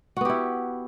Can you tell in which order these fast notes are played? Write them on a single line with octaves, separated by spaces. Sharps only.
F#4 B3 G4 E4